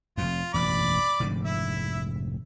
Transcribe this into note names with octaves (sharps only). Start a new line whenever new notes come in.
F1 F2 F4
E1 A1 F#2 D5 B5 D6
F1 G#2 D3
E4 E5